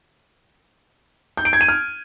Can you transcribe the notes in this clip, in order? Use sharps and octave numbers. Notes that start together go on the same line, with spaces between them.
G6
D7
G#6
D#7
F6